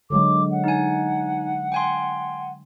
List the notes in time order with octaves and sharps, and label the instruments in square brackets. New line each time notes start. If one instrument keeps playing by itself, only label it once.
[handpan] D3 F#3 G#3 [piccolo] D6
[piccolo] F#5
[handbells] D#4 G#5
G5 G#5 C6